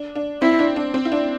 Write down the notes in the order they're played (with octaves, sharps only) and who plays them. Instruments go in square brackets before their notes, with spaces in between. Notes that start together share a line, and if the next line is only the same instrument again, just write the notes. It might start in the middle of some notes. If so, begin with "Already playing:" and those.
Already playing: [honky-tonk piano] D4
D4
[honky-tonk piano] C4 [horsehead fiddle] E4
[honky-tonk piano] D4
D4
C4
E4
D4